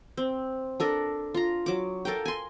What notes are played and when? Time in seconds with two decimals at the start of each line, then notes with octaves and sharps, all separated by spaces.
0.17 C4
0.80 D4 A4 A#4
1.34 F4 A#5
1.66 F#3 D6
2.05 A4 A#4 F5 G5
2.25 G#5 C6